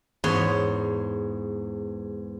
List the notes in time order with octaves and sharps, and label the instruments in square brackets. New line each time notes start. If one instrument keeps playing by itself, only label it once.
[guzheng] E2 G#2 C#5 C6